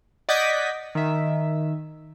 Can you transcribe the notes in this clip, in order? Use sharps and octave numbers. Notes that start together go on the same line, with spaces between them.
D5 D#5 F#5 G6 G#6 B6
D#3 E5